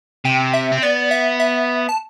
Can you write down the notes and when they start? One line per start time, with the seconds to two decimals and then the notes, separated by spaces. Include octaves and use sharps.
0.25 C3 G5
0.54 E5
0.72 C4
0.82 B3 D5
1.11 E5
1.40 E5
1.89 A5